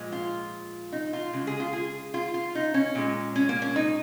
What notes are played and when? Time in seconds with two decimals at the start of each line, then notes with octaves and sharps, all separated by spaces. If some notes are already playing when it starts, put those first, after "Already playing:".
Already playing: A#2 F3 G#3
0.12 F4
0.92 D#4
1.13 F4
1.33 C#3 G#3
1.47 G#4
1.60 F4
1.73 G#4
2.14 F4
2.34 F4
2.55 D#4
2.74 C#4
2.95 A#2 G#3
3.36 C#4
3.49 A#3
3.62 C#4
3.76 D#4